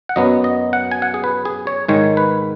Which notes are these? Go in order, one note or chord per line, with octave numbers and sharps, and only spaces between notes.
F#5
F#2 F#3 B3 D#5
D#5
F#5
G#5
F#5
G#4
B4
G#4
C#5
G#2 D#3 G#3 C#5
B4